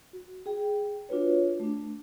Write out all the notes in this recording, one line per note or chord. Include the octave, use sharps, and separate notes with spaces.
F#4
G#4 G5
D4 F4 F#4 B4 C#5
A3 D4